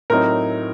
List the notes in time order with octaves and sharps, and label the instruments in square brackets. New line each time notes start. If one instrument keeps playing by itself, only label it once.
[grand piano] A2 F#3 C4 D#4 A#4